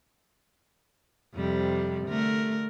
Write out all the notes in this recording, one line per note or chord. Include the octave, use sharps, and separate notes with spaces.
F2 C3 G3
D3 A3 A#4